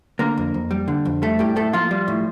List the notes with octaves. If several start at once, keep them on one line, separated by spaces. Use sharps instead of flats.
D3 A#3 A#4
F2
F2
G3
D3
F2
G3 A3 A4
A2 G3 G4
A2 A3 A4
F3 A#3 F4
G3
A2